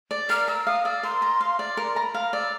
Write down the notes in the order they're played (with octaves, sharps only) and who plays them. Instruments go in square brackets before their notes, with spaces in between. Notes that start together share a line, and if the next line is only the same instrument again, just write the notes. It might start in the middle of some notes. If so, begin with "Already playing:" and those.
[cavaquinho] D5
[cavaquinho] A#4 [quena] F6
[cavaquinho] A#5 [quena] E6
[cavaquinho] F5 [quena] D#6
[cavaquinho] D5 [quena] E6
[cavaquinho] A#4 [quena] C6
[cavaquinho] A#5
F5
D5
[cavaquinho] A#4 [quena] C6
[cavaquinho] A#5 [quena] B5
[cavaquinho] F5 [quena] A#5
[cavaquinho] D5 [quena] E6